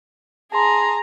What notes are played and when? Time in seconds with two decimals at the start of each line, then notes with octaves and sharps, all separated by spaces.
0.52 G#4 A5 A#5 C6